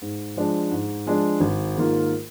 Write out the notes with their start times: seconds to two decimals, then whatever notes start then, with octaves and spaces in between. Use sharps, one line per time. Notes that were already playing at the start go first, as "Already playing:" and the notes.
0.02 G#2
0.37 F3 G#3 D4
0.71 G#2
1.06 F3 G#3 D4
1.40 G#1
1.75 G#2 D#3 A#3 F4